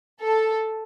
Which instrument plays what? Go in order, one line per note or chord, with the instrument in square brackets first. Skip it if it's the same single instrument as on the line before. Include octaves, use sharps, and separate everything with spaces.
[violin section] A4